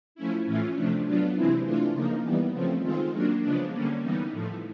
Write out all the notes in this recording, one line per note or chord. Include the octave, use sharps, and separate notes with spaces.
F3 A3 C#4 E4
A2 E3 A3 C#4 F4
C3 F3 A3 D4
F#3 B3 D4 F4
C3 E3 G#3 C4 E4
E3 A3 D4 F4
C#3 F3 A#3 D#4
E3 G3 B3
C#3 F3 A3 C4
D#3 G#3 C4 F4
F#3 A#3 D4
C#3 F3 G#3 B3 D4
D3 G3 A#3 C#4
E3 G3 B3 D#4
A2 F3 A3